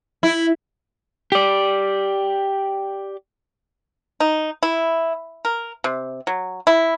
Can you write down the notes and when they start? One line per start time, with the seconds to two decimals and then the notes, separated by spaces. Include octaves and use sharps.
0.23 E4
1.32 G4 D5
4.20 D#4
4.63 E4
5.45 A#4
5.84 C3
6.27 F#3
6.67 E4